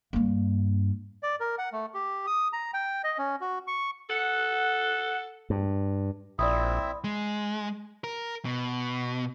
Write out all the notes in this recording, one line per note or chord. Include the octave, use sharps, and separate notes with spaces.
G2 A#3
D5
A#4
F#5
A3
G4
D#6
A#5
G5
D#5
C#4
F#4
C#6
A4 F#5
G2
A#1 C4 E4 D5 E5 D#6
G#3
A#4
B2